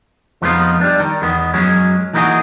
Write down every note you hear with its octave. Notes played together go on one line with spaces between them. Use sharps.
F2 F3 G#3 B3 D#4 F4
G3 D4
D#3
E2 G#3 B3
F#2 F#3 G#3 C#4
E3 A#3 D#4 E4 F#4 G#4